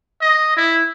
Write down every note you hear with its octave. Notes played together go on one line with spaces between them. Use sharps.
D#5
E4